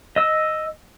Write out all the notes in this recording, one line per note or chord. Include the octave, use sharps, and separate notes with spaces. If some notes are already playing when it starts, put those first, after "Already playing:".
D#5 E6